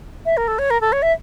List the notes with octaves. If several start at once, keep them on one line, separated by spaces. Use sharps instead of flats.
E5
A#4
A4
C#5
A#4
A4
C#5
E5